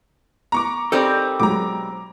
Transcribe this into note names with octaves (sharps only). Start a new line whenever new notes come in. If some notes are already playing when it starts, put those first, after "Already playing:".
B3 A#5 C#6 D6
G3 C4 D#4 A4 A#4 D5
B2 F#3 G#3 A#5 D6